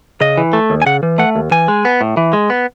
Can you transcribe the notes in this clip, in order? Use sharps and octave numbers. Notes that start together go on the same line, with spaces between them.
C#3 D#5
E3
A3
D#2
G#5
C#3 F#5
E3
A3 F#5
D#2
E3 G#5
G#3
B3
A2
E3
G#3
B3